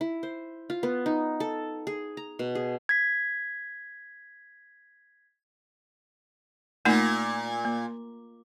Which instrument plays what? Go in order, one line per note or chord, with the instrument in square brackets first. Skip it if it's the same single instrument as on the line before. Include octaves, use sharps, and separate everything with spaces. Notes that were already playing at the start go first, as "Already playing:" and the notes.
[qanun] E4
C5
F4
B3
D#4
A4
G#4
A#5
B2
G#4
[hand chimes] G#6 B6
[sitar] A#2 [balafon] A3 A#3 D#4
[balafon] A#3